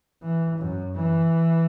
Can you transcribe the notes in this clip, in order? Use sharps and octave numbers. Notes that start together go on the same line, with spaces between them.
E3
F#2
E3